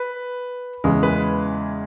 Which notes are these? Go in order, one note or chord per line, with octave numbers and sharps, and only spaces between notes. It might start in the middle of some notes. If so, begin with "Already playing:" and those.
Already playing: B4
E2 C#3 G#3
B4